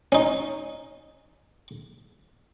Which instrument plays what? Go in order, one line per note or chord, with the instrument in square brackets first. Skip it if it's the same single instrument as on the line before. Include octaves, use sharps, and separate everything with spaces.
[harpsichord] C#4 D#4